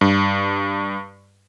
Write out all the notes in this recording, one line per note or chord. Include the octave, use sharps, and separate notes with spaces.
G2